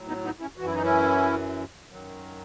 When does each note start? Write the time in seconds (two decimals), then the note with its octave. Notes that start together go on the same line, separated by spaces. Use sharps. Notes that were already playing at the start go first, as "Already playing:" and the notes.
Already playing: A2 F#3
0.08 B3 D#4
0.24 B3 D#4
0.41 C#4 E4
0.57 E3 F#4
0.62 F#2 E4
0.74 D#4
0.83 C#4 E4
1.91 F#2 D#3 F#3